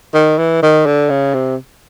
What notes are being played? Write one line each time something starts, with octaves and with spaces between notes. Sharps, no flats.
D#3
E3
D#3
D3
C#3
C3